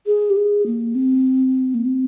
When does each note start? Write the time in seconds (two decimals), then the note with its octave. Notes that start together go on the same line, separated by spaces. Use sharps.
0.06 G#4
0.30 G4
0.37 G#4
0.66 A#3
0.95 C4
1.74 A#3
1.85 C4